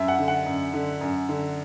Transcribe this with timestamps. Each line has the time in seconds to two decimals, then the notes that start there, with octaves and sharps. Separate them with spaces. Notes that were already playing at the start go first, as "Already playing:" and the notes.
Already playing: F#2 E5
0.08 F#5
0.19 D3
0.28 F#5
0.46 F#2
0.74 D3
1.01 F#2
1.29 D3